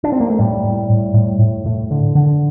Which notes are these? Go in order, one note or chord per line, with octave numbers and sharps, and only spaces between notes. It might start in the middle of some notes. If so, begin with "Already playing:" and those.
D4
C4
A#3
A3
A2 G3
A2
A2
A2
A2
A2
D3
D3